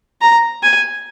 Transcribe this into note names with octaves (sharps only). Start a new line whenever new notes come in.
A#5
G#5